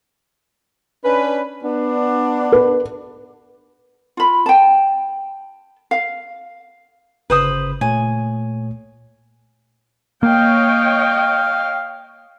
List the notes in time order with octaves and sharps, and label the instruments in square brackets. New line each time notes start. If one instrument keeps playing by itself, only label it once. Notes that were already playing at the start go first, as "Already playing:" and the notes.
[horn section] C#4 D4 B4
B3 D4
[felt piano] B4
[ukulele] F4 B5
G5 A5
F5
[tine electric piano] G1 C#3 G6 [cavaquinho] B4 C5 D#6
[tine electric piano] A#2 A3 C#5 [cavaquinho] G#5
[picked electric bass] A#3 [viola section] C#5 D#5 G5 [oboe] F5